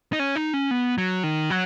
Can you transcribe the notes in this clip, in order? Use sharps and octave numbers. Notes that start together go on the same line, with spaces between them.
D#4
C#4
D#4
C#4
B3
F#3
D#3
F#3